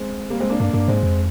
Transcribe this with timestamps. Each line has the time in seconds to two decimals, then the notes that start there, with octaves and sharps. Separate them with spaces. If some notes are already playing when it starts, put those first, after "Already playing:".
Already playing: G#3 C4
0.30 G3 A#3
0.40 G#3 C4
0.49 A#3 D4
0.60 G2 A#3 D4
0.73 G2 A#3 D4
0.88 G#2 G#3 C4
1.03 F2